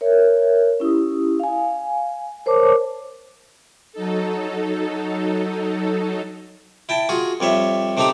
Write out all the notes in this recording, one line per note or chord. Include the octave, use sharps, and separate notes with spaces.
A#4 C#5 E5
C#4 E4 G4 D#6
F5 G#5
A#4 C5 C#5 A5 D6
F#3 D#4 A4
E4 G5 A5
F4 F#4 G#4
F2 G3 C#5 E5
C3 A3 D4 D#4 G4 A#5